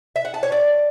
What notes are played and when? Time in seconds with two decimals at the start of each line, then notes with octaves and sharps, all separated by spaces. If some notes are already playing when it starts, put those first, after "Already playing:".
0.16 E5
0.25 F#5
0.34 A5
0.43 C#5
0.52 D5